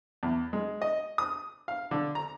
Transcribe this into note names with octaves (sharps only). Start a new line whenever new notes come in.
E2
G#3
D#5
D#6
F5
D3
A#5